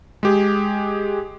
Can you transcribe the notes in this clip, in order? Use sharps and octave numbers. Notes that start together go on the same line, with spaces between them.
G#3 G4 G#4